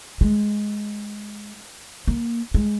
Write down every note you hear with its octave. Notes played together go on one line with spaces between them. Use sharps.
G#3
A#3
G#3